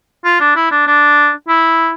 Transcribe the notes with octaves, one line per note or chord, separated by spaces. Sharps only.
F4
D4
E4
D4
D4
E4